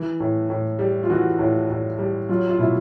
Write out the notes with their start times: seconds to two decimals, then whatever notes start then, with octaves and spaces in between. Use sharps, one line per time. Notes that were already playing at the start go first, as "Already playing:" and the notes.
Already playing: E3
0.20 A2
0.49 A2
0.79 G3
1.03 F4
1.10 E3 F#4
1.39 A2
1.70 A2
1.98 G3
2.29 F#3 F4
2.49 F4
2.58 B2 E4